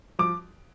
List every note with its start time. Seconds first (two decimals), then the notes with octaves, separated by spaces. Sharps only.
0.19 F3 D6